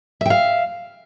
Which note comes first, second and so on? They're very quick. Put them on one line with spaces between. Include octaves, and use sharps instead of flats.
E5 G5 F5